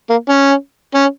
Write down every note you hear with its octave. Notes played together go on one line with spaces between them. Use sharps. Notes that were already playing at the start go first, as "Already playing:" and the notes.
A#3
C#4
C#4